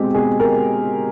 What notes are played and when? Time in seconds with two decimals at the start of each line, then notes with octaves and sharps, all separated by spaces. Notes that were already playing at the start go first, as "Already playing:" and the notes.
Already playing: B2 G#3 C4 G4
0.14 B2 G#4
0.40 A#4